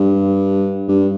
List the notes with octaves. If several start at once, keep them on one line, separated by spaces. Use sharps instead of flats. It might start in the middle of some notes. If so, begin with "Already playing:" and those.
Already playing: G2
G2